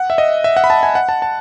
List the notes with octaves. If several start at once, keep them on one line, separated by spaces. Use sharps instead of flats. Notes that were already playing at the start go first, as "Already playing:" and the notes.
Already playing: F#5
E5
D#5
E5
F#5
B5
A5
G#5
F#5
A5
A5